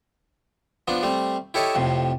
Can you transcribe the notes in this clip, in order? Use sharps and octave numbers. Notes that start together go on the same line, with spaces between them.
F3 B3 D4
G3 A3 C4
E4 G4 A4 C#5 D#5 E5
F2 A2 C3